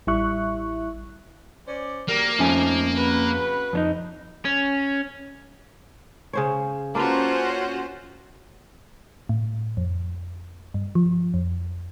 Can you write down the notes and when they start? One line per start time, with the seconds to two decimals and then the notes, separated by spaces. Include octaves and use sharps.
0.07 A1 G3 E4 E5 C#6 F#6
1.68 C#4 C5 D5
2.08 D2 G3 A#3 A#4
2.39 F2 D#3 F3 A3 C#4 G#5
2.97 C#3 F#4 B4
3.73 F2 C#4 D#4
4.45 C#4
6.33 C#3 C5 C#5
6.95 A#3 C#4 D4 F4 F#4 B4 C5
9.29 A2
9.77 F2
10.74 G2
10.95 F3
11.34 F2